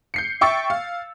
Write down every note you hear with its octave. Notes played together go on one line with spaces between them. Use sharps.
G6 C7 C#7
E5 G5 C#6 E6 A6 C#7
F5